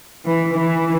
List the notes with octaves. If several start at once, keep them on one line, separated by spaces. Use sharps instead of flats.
E3
E3